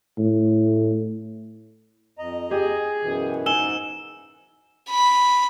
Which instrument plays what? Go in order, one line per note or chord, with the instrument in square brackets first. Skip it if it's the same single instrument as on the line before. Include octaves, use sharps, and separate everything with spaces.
[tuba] A2
[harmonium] F2 D#5 A#5
[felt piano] G4 [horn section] G#4
[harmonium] F#2 B2 E3
[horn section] G#2 [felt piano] G#5 [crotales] E6 E7 G7
[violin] B5